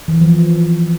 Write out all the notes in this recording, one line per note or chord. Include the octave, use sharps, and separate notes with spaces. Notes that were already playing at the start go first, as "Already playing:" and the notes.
E3
F3